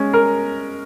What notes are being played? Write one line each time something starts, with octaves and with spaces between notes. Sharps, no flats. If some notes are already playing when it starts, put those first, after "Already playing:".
Already playing: G#3 C#4
A#4